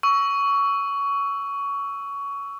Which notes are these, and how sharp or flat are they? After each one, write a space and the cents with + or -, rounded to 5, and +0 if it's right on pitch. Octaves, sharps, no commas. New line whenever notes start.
C#6 +20 E6 +0